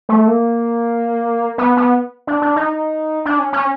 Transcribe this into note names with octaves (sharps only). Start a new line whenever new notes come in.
A3
A#3
B3
B3
D4
D4
D#4
D4
C#4
C#4